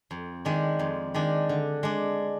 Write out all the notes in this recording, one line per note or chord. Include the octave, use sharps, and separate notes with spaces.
F2
D#3 G#3 D4
F2
D#3 G#3 D4
D3
G#3 D4